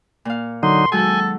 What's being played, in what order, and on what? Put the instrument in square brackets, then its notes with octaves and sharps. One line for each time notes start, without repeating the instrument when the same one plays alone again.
[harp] A#2 F5
[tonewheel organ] D3 F#3 D#4 [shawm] C6
[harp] D#3 F#3 G#3 [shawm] A4 [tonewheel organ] G#5